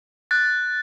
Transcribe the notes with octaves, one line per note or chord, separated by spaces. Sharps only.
F#6 A6